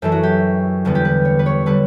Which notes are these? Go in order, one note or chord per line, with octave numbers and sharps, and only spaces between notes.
F#2 E3 A3 A4
F#4
G4
E2 D3 G3 B3
G4
B4
C#5
B4
C#5
D3 G3 B4